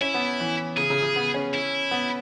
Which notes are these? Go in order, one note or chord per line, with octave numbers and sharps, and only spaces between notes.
C#4 E4
B3
E3
C#3 G#4
C#3
C#3
B3
C#4
E4
B3